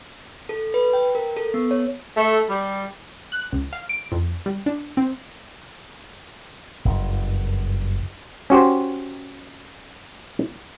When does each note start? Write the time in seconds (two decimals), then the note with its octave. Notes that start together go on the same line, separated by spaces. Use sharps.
0.49 A4
0.74 B4
0.93 G5
1.15 A#4
1.37 A4
1.54 B3
1.71 C#5
2.17 A3
2.49 G3
3.32 F#6
3.52 C#2
3.73 F5
3.89 D7
4.12 F2
4.46 G3
4.66 D4
4.97 C4
6.85 F#1 G2
8.50 C#4 F#4 G4 C5